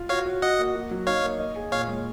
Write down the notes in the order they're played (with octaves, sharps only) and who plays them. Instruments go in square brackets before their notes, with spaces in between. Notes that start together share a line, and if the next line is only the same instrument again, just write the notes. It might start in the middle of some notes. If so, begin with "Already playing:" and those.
Already playing: [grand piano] F4
[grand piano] F#4 [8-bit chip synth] C#5 F5
[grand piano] F#4
[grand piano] F#4 [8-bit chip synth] D#5 F#5
[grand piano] A#3
F#4
F#3
[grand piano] D#4 [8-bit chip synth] C#5 F5
[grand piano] A#3
D#5
G#4
[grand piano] A#2 [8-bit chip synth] C#5 F5
[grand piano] G#3